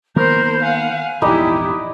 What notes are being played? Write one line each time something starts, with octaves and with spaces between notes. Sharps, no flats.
D#3 A#3 B3 A#4 C5 B5 G6
F5 F#5 G#5
A#1 E2 G#2 D#4 E4 G4 B4 D5